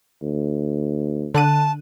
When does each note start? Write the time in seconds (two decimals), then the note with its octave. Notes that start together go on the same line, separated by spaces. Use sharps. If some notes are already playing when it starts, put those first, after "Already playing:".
0.22 D2
1.34 D3 A5 F#6 D#7